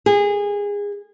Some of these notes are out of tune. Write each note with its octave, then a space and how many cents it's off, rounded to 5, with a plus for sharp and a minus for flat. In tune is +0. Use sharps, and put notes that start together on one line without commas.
G#4 -25